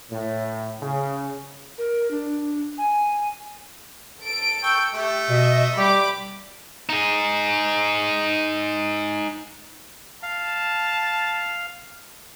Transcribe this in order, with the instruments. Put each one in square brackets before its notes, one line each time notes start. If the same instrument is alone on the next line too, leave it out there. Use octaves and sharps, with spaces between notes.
[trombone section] A2
C#3
[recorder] A#4
D4
G#5
[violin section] A4 D7
[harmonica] G5 C#6 E6
[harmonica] A3 [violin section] G4
[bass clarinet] B2 [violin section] D#5 E5
[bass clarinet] G3 [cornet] G4 [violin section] B5 D6
[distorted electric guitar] D#4 G#4
[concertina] F5 [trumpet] A5